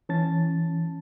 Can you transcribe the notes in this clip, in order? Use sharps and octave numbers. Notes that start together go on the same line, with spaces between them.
E3 C#4 A5 A6